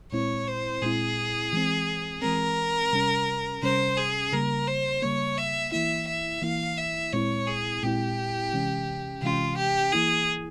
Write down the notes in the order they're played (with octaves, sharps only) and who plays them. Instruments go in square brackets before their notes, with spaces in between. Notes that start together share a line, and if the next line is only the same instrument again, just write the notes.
[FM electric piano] A#2 G#3 C4 E4 [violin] C#5
[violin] C5
[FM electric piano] A#2 G#3 C4 E4 [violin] G#4
[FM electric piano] E3 G#3 C4
[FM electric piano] E3 G#3 C4 [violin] A#4
[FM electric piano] C3 G3 C#4
[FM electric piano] C3 G3 C#4 [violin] C5
[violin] G#4
[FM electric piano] C#3 G3 A#3 [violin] A#4
[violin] C5
[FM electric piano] C#3 G3 A#3 [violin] C#5
[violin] E5
[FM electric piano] E3 A#3 E4 [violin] E5
[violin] E5
[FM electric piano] E3 A#3 E4 [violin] F5
[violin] E5
[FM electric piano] A#2 G#3 C4 E4 [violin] C#5
[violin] G#4
[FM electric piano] A#2 G#3 C4 E4 [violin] G4
[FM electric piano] C3 E3 G#3 C#4
[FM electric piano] C3 E3 G#3 C#4 [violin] F4
[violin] G4
[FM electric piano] E3 A#3 E4 [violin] G#4